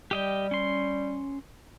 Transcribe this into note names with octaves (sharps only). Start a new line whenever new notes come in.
G3 G4 D#5 G5
C#4 C6